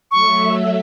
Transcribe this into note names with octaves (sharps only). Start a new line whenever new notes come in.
F#3 A3 E5 C#6